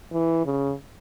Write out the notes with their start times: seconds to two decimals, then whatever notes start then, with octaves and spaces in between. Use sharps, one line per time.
0.13 E3
0.45 C#3